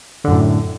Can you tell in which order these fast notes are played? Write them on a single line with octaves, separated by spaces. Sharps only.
D3 F#2 A2